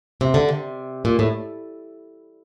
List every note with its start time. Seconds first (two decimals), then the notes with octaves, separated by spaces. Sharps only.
0.21 C3
0.34 D3
0.49 C3
1.05 A#2
1.19 A2